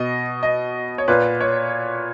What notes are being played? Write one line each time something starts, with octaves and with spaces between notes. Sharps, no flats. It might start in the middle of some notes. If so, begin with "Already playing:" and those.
Already playing: B2 D#5
D#5
C#5
A#2 B4
C#5